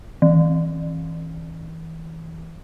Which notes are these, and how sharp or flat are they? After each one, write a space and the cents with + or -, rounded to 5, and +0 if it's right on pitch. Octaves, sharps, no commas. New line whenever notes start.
E3 -25